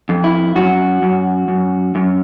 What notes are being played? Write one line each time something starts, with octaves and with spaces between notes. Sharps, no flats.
F2
E4
F#2 F#4
F#2
F#2
F#2